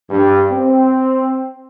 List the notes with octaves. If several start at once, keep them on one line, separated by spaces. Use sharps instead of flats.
G2
C4